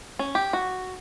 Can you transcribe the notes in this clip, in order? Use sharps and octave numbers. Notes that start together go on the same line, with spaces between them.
C#4
G4
F#4